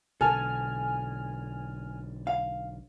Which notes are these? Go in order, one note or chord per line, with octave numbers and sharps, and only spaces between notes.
B1 D3 A4 G#5 A5 F6
F5